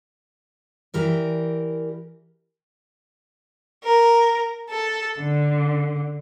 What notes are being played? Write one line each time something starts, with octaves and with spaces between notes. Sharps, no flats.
E3 G4 A#4 D5
A#4
A4
D3